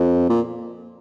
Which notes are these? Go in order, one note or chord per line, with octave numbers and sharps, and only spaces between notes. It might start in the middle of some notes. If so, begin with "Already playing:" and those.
Already playing: F2
A#2